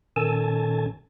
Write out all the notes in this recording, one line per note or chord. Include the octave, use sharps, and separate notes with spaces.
A#2 D#3 C#4 A4 G#5 A5